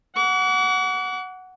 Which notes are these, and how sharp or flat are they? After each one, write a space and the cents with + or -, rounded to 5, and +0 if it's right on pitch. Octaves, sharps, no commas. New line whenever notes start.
F#5 +0 D6 -45